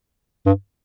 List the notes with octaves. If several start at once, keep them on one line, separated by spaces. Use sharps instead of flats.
G2